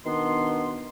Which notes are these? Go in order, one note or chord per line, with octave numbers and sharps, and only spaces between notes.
B2 D#3 B3 D4 C6